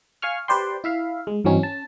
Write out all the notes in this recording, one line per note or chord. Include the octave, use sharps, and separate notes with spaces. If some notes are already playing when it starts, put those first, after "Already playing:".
F5 G#5 C#6 F6
G4 B4 C5 D5 G5 C6
E4 E5 F5
G#3
G2 E3 F#3 C4 C#4 D#4
C#4 A5